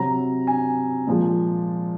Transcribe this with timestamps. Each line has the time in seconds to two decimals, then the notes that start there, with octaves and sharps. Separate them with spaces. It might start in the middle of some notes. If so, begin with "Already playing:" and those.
Already playing: C3 F#3 A#5
0.47 G#5
1.07 A#2 F3 G#3